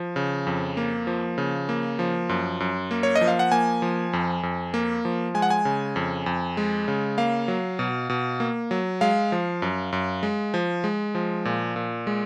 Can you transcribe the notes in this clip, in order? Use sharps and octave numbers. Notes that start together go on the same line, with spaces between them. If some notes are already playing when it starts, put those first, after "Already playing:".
Already playing: F3
C#3
F2
A#3
F3
C#3
A#3
F3
F#2
F#2
A#3
C#5
D#5
F3
F5
F#5
A#3 G#5
F3
F2
F2
A#3
F3
G#3 G#5
F#5
G#5
C#3
F2
F2
G#3
C#3
A#3 F5
F#3
B2
B2
A#3
F#3
G#3 F5
F3
F#2
F#2
G#3
F3
G#3
F3
A#2
A#2
G#3